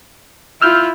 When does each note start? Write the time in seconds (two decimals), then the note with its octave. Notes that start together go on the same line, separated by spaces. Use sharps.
0.62 E4 F4 E6 F6 G6